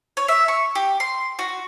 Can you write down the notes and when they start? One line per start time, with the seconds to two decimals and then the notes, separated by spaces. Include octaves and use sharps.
0.17 C#5
0.28 E5
0.48 C#6
0.75 G4
1.00 C6
1.39 F#4